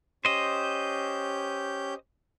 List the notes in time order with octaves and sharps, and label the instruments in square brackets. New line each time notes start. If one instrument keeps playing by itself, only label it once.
[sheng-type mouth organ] C#4 G4 G6 [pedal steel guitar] C5 D#5